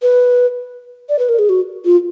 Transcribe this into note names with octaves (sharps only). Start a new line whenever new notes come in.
B4
D5
B4
A#4
G#4
F#4
F4